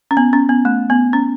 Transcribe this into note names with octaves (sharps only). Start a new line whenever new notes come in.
C#4
B3
C#4
B3
A3
B3
C#4